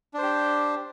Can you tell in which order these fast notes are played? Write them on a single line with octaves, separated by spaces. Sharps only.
D4 C5 G4